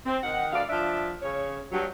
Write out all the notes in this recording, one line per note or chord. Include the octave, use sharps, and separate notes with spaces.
C4
D#3 F#5
D2 D5 F5
F3 D4 E5
C#3 C#5
G2 F#3